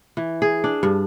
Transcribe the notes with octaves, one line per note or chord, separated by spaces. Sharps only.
E3
G#4
D4
G2